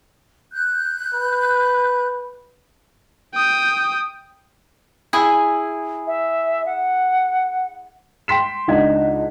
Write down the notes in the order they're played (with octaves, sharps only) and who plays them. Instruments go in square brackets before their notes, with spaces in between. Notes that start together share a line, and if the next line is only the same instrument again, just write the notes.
[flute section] F#6 G6
[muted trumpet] B4
[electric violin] G5 D#6
[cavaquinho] E4 G#4 G#5
[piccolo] E5
F#5
[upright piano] G5 C6 B6 E7
C#2 D4 D#4 F#5 G#6